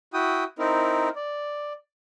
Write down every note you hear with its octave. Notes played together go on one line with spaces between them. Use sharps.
E4 F#4 G5 D#6
C4 D#4 E4 A#4
D5